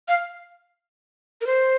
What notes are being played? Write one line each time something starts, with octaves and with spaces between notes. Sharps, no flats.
F5
A#4
C5